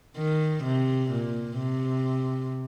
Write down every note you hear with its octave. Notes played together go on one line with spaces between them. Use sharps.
D#3
C3
A#2
C3